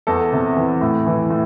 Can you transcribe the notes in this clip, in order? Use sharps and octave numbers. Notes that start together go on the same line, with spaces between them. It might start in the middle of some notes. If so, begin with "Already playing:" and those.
E2 A4
C3
E3
A2
E3
A2